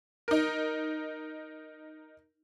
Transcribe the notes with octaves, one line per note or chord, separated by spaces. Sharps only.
D#4 A#4